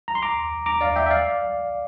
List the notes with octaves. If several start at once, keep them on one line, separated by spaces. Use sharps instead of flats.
A#5
C6
A#5 D6
A#5 D6
D5 F5
E5 G5
E5
D5 F5